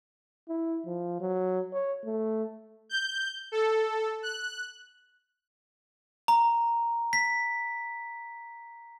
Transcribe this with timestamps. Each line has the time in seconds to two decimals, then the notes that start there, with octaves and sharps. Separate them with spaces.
0.49 E4
0.87 F3
1.20 F#3
1.73 C#5
2.05 A3
2.89 G6
3.52 A4
4.23 F#6
6.28 A#5
7.13 B6